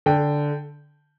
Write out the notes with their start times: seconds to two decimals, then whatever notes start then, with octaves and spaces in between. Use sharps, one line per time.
0.06 D3 G5